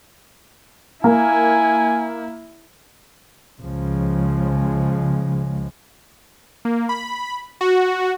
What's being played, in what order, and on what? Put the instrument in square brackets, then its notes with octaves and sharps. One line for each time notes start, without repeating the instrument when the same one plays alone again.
[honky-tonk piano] A#3 [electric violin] E4 [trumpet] G#5
[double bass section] C#2 C#3 F3 G#3
[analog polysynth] A#3
B5
F#4